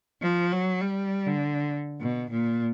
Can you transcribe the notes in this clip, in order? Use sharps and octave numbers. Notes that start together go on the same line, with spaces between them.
F3
F#3
G3
D3
B2
A#2